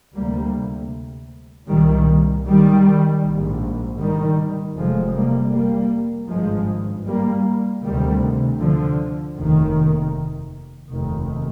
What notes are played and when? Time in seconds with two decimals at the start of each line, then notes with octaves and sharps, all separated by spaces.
0.16 D2 C3 G3 A#3
1.69 C2 A#2 D#3 G3
2.46 D#3 G3
3.24 A#1 G#2
4.00 D#3 G3
4.76 F1 F2 C3 F3 G#3
5.15 G3 A#3
5.54 G3 A#3
6.30 G#1 G2 F3 G#3
7.07 G3 A#3
7.83 D2 C3 D#3 G3
8.61 D3 F3
9.37 F1 D#2 D#3
10.90 F1 D#2 D#3